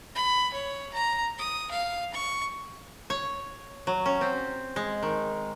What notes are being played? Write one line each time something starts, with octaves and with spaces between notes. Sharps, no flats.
B5
C#5
A#5
D#6
F5
C#6
C#5
F#3
C#4
C4
G#3
D#3